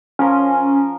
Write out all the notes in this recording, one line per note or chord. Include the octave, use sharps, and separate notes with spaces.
F3 C#4 A#4 C6